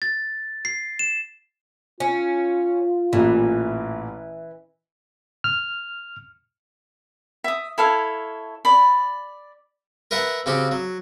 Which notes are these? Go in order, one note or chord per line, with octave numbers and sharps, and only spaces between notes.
A6
C7
E7
C#4 F4
A1 A#2 E3
F6
E5 D#6
E4 A4 C#5 F5
D5 B5
A#4 B4 E5 F#5 A5
C#3 C4 F#4 G4
F#3